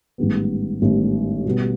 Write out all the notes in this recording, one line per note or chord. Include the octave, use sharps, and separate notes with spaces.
A1 G#2 D#3 G3 B3
A1 G#2 D#3 G3 B3
B2 G3 B3